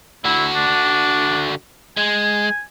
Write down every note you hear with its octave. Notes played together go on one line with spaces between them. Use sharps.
D3 E4 F#4
D4
G#3 G#5